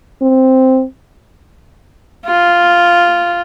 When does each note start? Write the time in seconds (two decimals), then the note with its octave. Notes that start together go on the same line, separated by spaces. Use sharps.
0.22 C4
2.26 F4